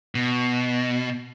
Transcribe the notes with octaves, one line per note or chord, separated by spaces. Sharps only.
B2